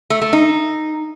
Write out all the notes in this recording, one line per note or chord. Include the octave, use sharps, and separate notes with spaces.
A3
A3
D#4